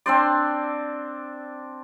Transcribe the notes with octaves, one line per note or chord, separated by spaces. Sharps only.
C4 D4 C5 D5